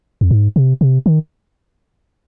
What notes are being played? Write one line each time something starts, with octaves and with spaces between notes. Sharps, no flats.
F2
G#2
C3
C3
D#3